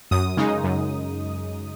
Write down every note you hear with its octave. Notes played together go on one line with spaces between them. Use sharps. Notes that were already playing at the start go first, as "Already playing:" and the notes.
F#2 D#6
C#3 G#3 D#4
F#2